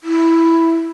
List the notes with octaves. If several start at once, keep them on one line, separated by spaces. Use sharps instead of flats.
E4